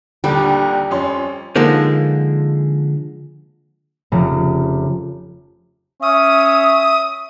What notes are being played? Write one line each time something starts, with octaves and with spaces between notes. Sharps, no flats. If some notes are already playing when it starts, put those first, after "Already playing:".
A#1 D#2 D3 G3
F2 C#4 C6
D3 F3 G#3 A#3 D#4
F1 C#3
C#4 E5 D#6